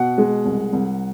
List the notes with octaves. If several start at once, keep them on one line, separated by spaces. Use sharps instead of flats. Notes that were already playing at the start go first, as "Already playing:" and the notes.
Already playing: B2 F#5
G#3
C2
C2